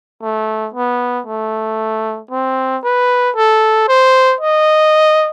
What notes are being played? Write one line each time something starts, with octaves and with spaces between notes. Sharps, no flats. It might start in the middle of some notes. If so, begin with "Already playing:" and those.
A3
B3
A3
C4
B4
A4
C5
D#5